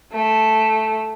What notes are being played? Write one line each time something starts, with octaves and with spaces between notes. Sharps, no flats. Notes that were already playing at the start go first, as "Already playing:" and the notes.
A3